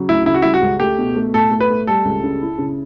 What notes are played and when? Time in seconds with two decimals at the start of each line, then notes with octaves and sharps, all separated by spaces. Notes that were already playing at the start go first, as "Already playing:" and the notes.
Already playing: C#3 F#3
0.09 D2 E4
0.26 C#3 E4
0.34 F#4
0.42 G3 E4
0.54 F#4
0.62 C#2
0.80 A3 G4
0.98 B2
1.16 A3
1.33 A2 A4
1.51 A3
1.61 B4
1.70 A3
1.87 G3 A4
2.05 C#2
2.23 C#3
2.41 E4
2.58 C#3